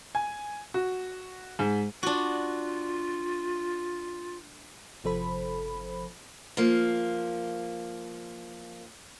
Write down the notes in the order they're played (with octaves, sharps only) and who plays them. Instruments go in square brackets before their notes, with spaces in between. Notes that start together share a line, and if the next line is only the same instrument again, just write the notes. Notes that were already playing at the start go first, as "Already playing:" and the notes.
[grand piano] G#5
F#4
G#2
[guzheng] D4 F#4 [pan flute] F4
[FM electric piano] G1 C3 F3 A4 C5 B5
[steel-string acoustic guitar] F3 A#3